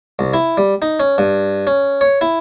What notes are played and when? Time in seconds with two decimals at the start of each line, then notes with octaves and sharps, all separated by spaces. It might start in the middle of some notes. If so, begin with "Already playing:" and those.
0.19 C2
0.34 E4
0.57 G3
0.82 D#4
1.00 C#4
1.18 G2
1.67 C#4
2.01 C#5
2.21 E4